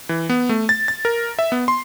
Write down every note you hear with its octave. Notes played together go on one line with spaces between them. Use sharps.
E3
B3
A3
A6
A6
A#4
E5
B3
C6